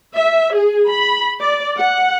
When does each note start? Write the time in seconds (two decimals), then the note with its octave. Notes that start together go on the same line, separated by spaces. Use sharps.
0.15 E5
0.54 G#4
0.90 B5
1.41 D5
1.78 F#5